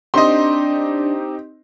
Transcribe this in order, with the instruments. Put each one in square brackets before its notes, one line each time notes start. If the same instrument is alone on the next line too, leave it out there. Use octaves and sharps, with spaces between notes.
[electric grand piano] C4 D#4 G4 [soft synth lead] D4 [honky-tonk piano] D#5 C6